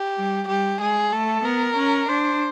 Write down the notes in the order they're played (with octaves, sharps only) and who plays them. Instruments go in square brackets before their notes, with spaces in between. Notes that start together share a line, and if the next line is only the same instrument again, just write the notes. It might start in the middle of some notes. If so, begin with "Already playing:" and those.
Already playing: [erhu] G4
[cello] G3
[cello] G3 [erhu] G4
[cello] G#3 [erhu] G#4
[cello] A3 [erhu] A4
[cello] B3 [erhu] A#4
[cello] C#4
[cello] D4 [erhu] C5